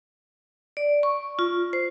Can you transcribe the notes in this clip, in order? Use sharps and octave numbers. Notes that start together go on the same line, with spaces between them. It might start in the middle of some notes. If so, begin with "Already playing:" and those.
D5
C#6
F4
C5